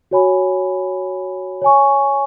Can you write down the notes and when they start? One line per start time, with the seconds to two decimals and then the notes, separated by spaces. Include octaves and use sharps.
0.11 F#4 C#5 G#5 B5
1.62 C#5 G#5 C#6